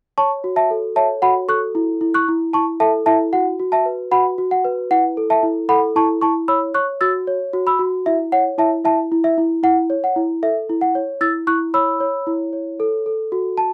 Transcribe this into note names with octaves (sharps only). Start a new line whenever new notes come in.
C#5 A5 C#6
F#4
E5 A5
A4
C#5 E5 A5
F#4 F#5 B5
A4 C#6 F#6
E4
E4
C#6 F#6
E4
E4 A5 C#6
A4 E5 A5
E4 E5 A5
F#4 F#5
F#4
E5 A5
B4
F#4 F#5 B5
F#4
F#5
B4
E4 F#5
A4
E5 A5
E4
A4 F#5 B5
E4 A5 C#6
E4 A5 C#6
C#5 B5 E6
C#5 C#6 F#6
F#4 E6 A6
C#5
F#4
B5 E6
F#4
E4 E5
C#5 F#5
E4 E5 A5
E4 E5 A5
E4
E5
E4
E4 F#5
C#5
F#5
E4
A4 E5
E4
F#5
C#5
E4 E6 A6
E4 C#6 F#6
C#5 B5 E6
C#5
E4
C#5
A4
A4
F#4
A5